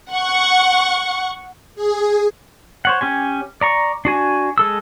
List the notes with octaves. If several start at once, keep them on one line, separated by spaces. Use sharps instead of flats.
F#5 C#6
G#4
C5 C#5 F#5
C#4 G4 G#5
D5 A#5 C#6
D4 F#4 G#5
G#3 A4 E6